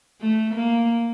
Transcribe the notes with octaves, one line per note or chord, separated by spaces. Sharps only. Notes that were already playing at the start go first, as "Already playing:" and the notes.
A3
A#3